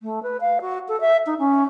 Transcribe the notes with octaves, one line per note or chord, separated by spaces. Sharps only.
A3
B4
F5
F#4
A4
E5
D#4
C#4